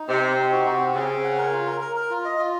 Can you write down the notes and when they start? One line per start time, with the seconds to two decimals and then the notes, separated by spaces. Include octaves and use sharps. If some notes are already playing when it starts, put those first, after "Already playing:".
Already playing: D#4
0.08 C3 C4
0.22 C4
0.37 D#4
0.51 F#4
0.65 C3 F#4
0.80 C4
0.94 C#3 C4
1.09 C4
1.24 F#5
1.37 A#4
1.53 F4
1.66 A#4
1.81 A#4
1.96 A#4
2.10 F4
2.25 D#5
2.38 F4